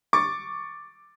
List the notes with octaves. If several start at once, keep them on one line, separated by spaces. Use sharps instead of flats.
C#6 D6 A6